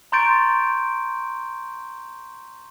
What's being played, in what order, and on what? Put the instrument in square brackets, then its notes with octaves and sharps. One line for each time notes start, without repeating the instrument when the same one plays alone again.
[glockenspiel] A#5 C6 C#6 G6 A6 D7